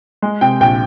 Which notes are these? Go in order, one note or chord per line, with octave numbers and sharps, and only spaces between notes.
G#3
C3 G5
A#1 G5